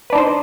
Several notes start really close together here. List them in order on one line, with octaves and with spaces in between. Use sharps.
B4 D4 D#4 C5